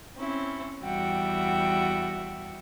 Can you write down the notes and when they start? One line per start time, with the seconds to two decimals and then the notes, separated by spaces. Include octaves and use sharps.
0.17 C4 C#4 E4
0.82 E2 G3 F#4 E5 F#5 G5